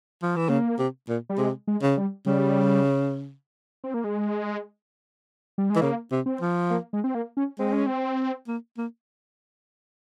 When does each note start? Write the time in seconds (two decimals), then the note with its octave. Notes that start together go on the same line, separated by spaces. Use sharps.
0.22 F3
0.36 E3
0.49 C#3 A#3
0.78 C3
1.09 A#2
1.29 G3
1.38 C3 G#3
1.68 G#3
1.82 C#3
1.97 G3
2.26 C#3 G3
3.84 C4
3.94 A#3
4.04 G#3
5.58 G3
5.70 G#3
5.76 E3
5.81 C#3 A#3
6.11 C3
6.26 C4
6.41 F3
6.70 A#3
6.93 G#3
7.04 C4
7.15 A#3
7.37 C#4
7.59 G#3 C4
7.73 C#4
7.86 C4
8.48 A#3
8.77 A#3